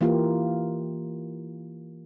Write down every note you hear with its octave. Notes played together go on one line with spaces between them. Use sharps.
E3 A#3 F4 G4